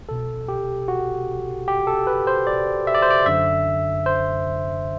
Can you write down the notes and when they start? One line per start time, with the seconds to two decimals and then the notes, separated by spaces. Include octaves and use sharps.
0.09 C2 B2 A4
0.48 G4
0.88 F#4
1.68 G4
1.87 A4
2.07 B4
2.27 C5
2.47 D5
2.87 E5
2.95 D5
3.02 C5
3.10 D5
3.26 F#2 D3 E5
4.06 C5